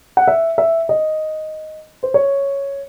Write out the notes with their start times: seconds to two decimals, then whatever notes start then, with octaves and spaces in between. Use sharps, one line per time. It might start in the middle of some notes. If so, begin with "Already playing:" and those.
0.17 F#5
0.27 E5
0.58 E5
0.89 D#5
2.03 C5
2.14 C#5